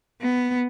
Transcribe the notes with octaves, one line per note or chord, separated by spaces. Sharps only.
B3